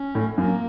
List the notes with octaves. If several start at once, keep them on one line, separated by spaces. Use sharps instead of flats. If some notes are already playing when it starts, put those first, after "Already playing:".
Already playing: C#4
A2
F#2 A#3